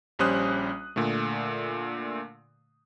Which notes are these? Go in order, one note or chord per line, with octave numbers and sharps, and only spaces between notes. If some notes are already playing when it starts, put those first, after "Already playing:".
A#1 G3 C#4 C5 D#6 F#6
A#2 D3 A3